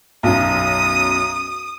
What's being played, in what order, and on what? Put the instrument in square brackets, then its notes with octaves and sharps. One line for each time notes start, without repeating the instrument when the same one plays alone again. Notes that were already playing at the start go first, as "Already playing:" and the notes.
[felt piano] B1 F#2 [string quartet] D#6